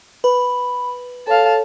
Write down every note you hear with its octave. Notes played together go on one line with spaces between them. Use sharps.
B4 B5
A4 C#5 F5 A5